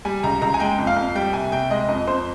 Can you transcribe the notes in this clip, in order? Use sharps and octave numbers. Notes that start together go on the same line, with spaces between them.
G3 G#5
C#2 A#5
C#2 A#5
G#5
G#3 G5
F2
F5
F2
G3 G5
C2 G#5
C2 G5
G#3 D#5
F2 D#5
F2 C5